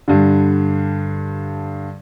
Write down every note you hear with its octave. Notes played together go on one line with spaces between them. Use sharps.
G2 D3